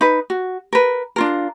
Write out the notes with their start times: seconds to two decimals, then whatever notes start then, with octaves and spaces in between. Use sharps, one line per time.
0.01 D#4 B4
0.30 F#4
0.73 A#4 B4
1.16 D4 F4 A#4